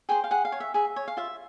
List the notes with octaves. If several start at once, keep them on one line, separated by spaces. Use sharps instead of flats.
G#4 C5 G5
F5
G#4 F#5
F5
C#5
E5
G#4 E5
C#5
F5
F4 E5